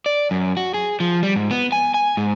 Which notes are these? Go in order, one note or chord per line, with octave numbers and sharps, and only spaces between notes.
D5
F#2
F#4
G#4
F3
G3
G#2
B3
G#5
G#5
G#2